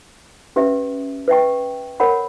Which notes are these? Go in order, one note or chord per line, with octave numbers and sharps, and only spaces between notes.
C#4 G4 B4 E5
B4 E5 G5 C#6
A#4 C#5 F#5 B5